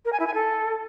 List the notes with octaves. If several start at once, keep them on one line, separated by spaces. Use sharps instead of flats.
A#4
G#5
E4
G#5
A4